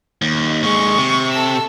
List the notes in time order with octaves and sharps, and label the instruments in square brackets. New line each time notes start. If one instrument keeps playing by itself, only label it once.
[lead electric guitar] D#2
[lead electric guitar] D#2 G#3 [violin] C#6
[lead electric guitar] C3
[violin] A4 E6